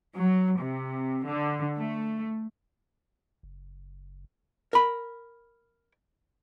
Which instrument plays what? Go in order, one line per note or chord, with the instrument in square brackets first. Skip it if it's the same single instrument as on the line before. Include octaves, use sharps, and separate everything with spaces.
[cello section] F#3
C3
D3
A3
[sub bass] F#1
[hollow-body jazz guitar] A#4 B5